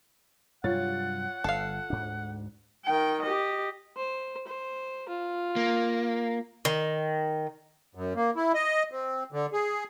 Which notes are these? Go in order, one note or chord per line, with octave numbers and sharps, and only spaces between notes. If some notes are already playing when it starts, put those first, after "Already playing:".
G2 C3 F#3 F4 C#5 F#5 A6
G1 A4 F5
D2 G#2 D4
D#3 G5
G4 D#5
C5
C5
F4
A#3
D#3
F#2
A#3
E4
D#5
C4
D3
G#4